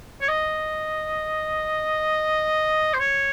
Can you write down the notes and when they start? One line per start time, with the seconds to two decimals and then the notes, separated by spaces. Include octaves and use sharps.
0.21 C#5
0.28 D#5
2.94 C5
3.00 C#5